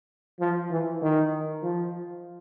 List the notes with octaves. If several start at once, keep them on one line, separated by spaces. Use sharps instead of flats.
F3
E3
D#3
F3